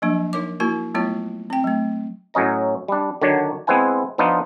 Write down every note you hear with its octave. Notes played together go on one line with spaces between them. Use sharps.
F3 F#3 A#3 D4
D#4 A#4 C#5 D6
A#3 E4 F#4 A#4
F#3 A3 B3 E4 F4 C#5
C4 G5
F#3 A3
A2 F#3 C#4 D#5 A#5
G3 D4
D3 D#3 F#3 D4 C#5
G#3 B3 C4 E4 F#5 G#5
F3 B3 D4 D#4 F4